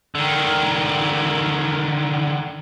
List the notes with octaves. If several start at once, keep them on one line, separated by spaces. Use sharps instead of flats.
D3 D#3